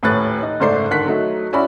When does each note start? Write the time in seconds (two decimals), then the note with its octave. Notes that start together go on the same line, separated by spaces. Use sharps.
0.03 D#1 A2 B4 C#5 F#6 A6
0.43 D#4
0.60 F#1 G#2 A3 C5 D5 C7
0.91 D3 D#3 F#6 B6
1.06 F#3 A3 D#4
1.53 C#4 E4 F#4 D5 B5